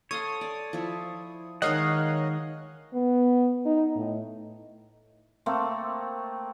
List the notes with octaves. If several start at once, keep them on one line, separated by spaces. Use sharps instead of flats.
A4 C#5 F5 C6 D#6
D5
F3 E4
D#3 G#3 A#4 C#5 D#5 F5 F#5
B3
D#4
A2
A3 A#3 C4